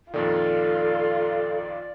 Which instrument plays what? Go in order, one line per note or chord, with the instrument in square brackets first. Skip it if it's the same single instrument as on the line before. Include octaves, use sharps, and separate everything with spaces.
[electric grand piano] F2 A#2 D#3 [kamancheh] F4 [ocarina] A4 [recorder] D5